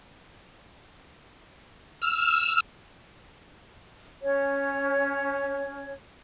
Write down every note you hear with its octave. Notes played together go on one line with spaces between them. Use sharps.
E6 F6
C#4 C#5